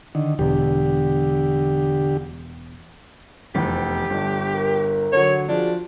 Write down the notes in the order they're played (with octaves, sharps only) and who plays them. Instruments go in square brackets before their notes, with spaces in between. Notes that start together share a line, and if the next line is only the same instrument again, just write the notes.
[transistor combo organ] D3 D#3
[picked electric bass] E1 E2 [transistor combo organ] D3 G4
[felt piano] F1 E2 [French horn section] B3 C4 [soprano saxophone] G4
[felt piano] G1 [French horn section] A3 D4
[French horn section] A#4
[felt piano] D3 F#3 [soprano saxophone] C#5
[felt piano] F3 [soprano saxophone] D4 [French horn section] F#4 G#4 D5